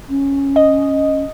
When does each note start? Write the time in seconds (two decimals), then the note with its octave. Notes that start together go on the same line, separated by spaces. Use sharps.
0.09 C#4
0.56 D#5